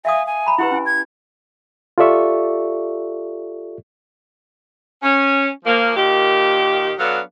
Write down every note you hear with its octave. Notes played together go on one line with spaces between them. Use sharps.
E5 F5 G#5 D#6
G#5
A#5 B5
E4 G4 B4 F#5
C#4 E4 G#5
G#6
F4 G4 A4 D5 E5 C#6
C#4
F3 A#3
A#2 D#3 G4
F#3 B3 D4 A4 F5